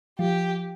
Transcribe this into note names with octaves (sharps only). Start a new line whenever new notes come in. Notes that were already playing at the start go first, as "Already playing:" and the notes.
F3 G4